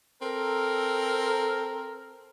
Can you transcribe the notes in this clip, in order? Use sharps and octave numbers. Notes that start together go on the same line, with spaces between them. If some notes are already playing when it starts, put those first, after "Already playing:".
C4 A4 A#4